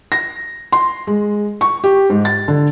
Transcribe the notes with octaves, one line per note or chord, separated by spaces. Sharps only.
A#6
C6
G#3
C#6
G4
G#2
A6
D3